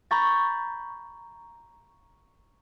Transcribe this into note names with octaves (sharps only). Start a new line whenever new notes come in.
A#5 B5 C#6 G6 A6